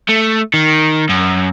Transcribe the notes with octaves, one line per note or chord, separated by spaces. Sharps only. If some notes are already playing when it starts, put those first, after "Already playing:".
A3
D#3
F#2